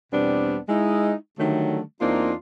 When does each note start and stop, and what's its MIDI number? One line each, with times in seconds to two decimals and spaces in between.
0.12 0.57 40
0.12 0.57 47
0.12 0.57 55
0.12 0.57 59
0.12 0.57 60
0.12 0.57 62
0.69 1.12 56
0.69 1.12 63
0.69 1.12 64
1.39 1.79 50
1.39 1.79 51
1.39 1.79 54
1.39 1.79 55
1.39 1.79 57
2.00 2.32 40
2.00 2.32 58
2.00 2.32 60
2.00 2.32 62
2.00 2.32 63
2.00 2.32 65